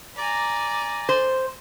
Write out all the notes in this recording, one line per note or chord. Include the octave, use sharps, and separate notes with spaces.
D5 G#5 A#5
C5